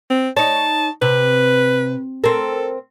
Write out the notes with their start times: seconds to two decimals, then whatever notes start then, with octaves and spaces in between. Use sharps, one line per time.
0.10 C4
0.37 D#4 C#5 A5
1.02 C3 B4
2.24 C4 A4 A#4